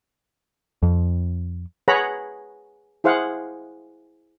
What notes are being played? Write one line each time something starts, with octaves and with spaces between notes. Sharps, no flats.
F2
G#4 B4 C#5 F#5 A#5 B5
E4 G#4 C5 F5 F#5